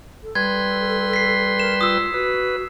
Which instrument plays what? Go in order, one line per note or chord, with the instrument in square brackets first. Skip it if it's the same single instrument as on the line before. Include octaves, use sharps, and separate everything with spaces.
[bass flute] A4
[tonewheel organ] G3 B4 C6 [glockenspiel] G#6
[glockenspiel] B6 C7
[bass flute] A#4 [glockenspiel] E7
[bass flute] F4 [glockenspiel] D#6 E6
[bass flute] F#4 [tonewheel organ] B4